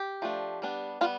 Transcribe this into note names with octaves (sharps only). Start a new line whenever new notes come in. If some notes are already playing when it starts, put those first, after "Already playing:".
Already playing: G4
F3 A3 D4
G3 B3 D4
G3 B3 F4